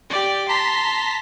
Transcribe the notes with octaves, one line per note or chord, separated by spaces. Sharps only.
G4 D5
A5 A#5 C6 B6